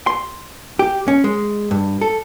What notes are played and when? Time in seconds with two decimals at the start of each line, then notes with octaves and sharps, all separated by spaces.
0.07 C6
0.79 G4
1.08 C#4
1.24 G#3
1.71 G2
2.01 A4